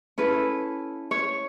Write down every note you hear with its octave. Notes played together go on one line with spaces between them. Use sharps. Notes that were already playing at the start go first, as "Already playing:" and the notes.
C#4 E4 A4 B4
C#5